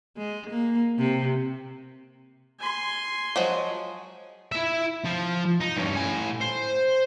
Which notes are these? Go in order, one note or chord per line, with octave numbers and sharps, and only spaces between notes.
G#3
A#3
C3
G#5 C6
F3 F#3 G#3
E4 E5
F3
D#4
G2 C#4
A2 G#5
C5